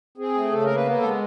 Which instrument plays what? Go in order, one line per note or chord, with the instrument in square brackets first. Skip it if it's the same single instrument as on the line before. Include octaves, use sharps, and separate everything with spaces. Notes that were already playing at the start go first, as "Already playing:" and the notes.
[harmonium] C4 G#4
A3
C#3 A4
A#3 A#4
B4
B3
A4
G#3